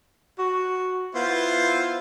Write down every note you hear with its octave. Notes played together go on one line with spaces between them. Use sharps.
F#4
B3 E4 F4 C5